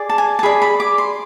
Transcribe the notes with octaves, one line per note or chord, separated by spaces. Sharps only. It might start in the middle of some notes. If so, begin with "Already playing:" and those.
Already playing: G#4 D5
A5
G#5
A5
G#4 D5 B5
B5
D6
C6